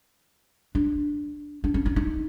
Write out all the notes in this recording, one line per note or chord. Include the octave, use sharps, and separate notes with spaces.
D4
D4
C#4
D#4
D#4